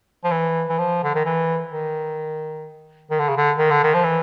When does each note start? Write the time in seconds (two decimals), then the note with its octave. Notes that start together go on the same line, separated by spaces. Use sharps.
0.24 F3
0.31 E3
0.69 E3
0.78 F3
1.04 D3
1.15 D#3
1.25 E3
1.71 D#3
3.11 D#3
3.19 D3
3.29 C#3
3.37 D3
3.58 D#3
3.71 D3
3.84 D#3
3.94 F3
4.04 E3